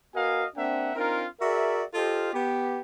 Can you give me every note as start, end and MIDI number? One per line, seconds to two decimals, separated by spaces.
0.14 0.45 59
0.14 0.45 66
0.14 0.45 70
0.14 0.45 75
0.14 0.45 77
0.14 0.45 80
0.57 0.95 58
0.57 0.95 60
0.57 0.95 62
0.57 0.95 76
0.57 0.95 78
0.57 0.95 79
0.96 1.25 60
0.96 1.25 62
0.96 1.25 63
0.96 1.25 65
0.96 1.25 70
1.41 1.83 66
1.41 1.83 68
1.41 1.83 70
1.41 1.83 74
1.41 1.83 76
1.95 2.31 65
1.95 2.31 67
1.95 2.31 69
1.95 2.31 72
1.95 2.31 75
1.95 2.31 77
2.33 2.81 59
2.33 2.81 67